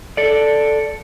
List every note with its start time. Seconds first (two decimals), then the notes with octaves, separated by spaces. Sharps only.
0.17 A4 D5